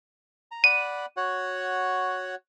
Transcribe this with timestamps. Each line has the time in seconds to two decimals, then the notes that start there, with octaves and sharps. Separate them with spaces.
0.51 A#5
0.64 D5 F#5 B5 D#7
1.17 F#4 C#5 F#5